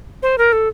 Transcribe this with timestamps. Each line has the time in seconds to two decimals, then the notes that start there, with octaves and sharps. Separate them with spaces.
0.23 C5
0.38 A#4
0.53 A4